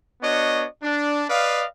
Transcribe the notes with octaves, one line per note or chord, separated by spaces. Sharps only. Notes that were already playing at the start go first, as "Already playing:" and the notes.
B3 D4 F#4 C#5 D#5
D4
B4 D5 D#5 F5